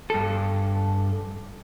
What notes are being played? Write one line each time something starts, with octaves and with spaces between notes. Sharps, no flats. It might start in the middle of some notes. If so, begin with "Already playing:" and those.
G2 A4